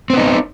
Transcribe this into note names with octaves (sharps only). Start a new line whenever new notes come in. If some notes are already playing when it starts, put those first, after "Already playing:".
B3 C4 D#4